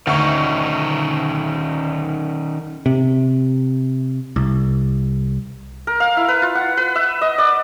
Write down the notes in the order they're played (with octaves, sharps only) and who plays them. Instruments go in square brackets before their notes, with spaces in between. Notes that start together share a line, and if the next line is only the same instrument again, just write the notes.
[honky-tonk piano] D2 C#6 [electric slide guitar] D#3 C#4 D#4
[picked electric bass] C3
C2
[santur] A#4
F5
E4
B4
F4
F#5
B4
E5
D#5
D5